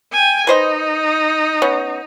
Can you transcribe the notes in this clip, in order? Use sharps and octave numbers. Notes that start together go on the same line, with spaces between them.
G5 G#5
D#4 B4 C5 D#5
B3 C#4